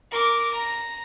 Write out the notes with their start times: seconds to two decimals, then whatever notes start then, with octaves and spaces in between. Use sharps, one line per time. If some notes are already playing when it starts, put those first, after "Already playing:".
0.11 A#4 D6
0.53 A#5